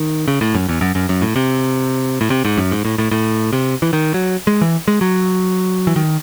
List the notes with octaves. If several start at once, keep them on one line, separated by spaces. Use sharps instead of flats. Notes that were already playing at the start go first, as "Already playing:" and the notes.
Already playing: D#3
C#3
A2
F#2
E2
F#2
F#2
F#2
A2
C3
A2
C3
G#2
F#2
G#2
A2
A2
A2
C3
E3
D#3
F#3
G#3
E3
G#3
F#3
E3
D#3